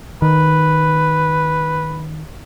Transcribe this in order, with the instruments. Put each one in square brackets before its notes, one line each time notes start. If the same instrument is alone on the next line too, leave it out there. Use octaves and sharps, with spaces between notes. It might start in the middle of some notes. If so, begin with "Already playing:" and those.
[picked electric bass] D#3 [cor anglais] B4